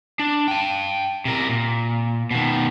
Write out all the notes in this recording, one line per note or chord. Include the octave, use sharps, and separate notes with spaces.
D4
G5 A5
C3 A#4
A#2
B2 D#3